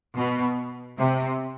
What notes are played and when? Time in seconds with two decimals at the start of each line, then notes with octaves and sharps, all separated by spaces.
0.16 B2
0.98 C3